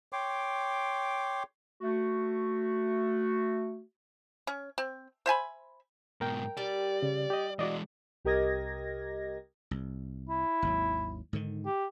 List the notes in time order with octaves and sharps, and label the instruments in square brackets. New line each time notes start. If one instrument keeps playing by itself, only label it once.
[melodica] C#5 G5 C6 D6
[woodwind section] A3 F#4
[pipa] C#4
C4
C5 E5 G#5 B5
[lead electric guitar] G#2 B2 [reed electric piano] A#4 G5
[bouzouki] G3 [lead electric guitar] D5
[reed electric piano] C#3
G4 D#5
[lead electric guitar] E3 G#3 [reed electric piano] F#4 D5 D#5
[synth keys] C2 G4 A#4 D#5 G#6 A#6
[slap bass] C2
[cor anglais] E4
[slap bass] G#1 D#2 F#3
G#2 D3 D#3
[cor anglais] G4